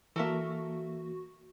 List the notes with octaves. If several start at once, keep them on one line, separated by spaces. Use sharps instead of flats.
E3 A#3 F#4 A4 A#4 E5